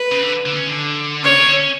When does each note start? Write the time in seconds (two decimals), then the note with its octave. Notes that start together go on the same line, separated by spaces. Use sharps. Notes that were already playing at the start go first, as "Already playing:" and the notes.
Already playing: B4
0.12 C#3
0.22 D3
0.46 D3
0.52 B3
0.56 C#4
0.67 D3
1.23 C#3 C#5
1.35 C#3
1.46 D3
1.57 C#4